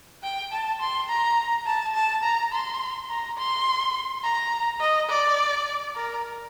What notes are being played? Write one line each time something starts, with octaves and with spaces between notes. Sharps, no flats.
G5
A5
C6
A#5
A5
A5
A#5
C6
A#5
C6
A#5
D#5
D5
A#4